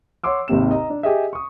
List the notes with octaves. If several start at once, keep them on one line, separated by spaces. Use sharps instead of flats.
C#5 F#5 C6 D6 E6
G#1 D#2 C3 E7
D#5 A#5
D4
G4 G#4 D#5 E5
C#6 D#6